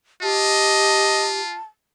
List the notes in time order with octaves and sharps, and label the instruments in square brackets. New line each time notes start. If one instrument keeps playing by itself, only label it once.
[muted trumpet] F4 [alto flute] G4 [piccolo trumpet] D#5 [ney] A5